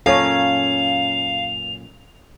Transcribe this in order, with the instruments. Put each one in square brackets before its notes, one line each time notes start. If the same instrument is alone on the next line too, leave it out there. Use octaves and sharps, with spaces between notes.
[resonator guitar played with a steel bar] F#2 A#2 C#4 [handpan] A4 C#5 [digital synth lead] F5 [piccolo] F7